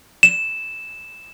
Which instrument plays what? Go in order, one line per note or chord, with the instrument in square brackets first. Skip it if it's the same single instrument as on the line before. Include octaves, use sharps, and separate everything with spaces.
[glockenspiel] E7